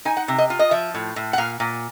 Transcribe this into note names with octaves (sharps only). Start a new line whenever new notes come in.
D#4 G#5
F#5
C3
D#5
F4
D#5
F3 E5
A2
A2
F#5
A#2 F5
A#2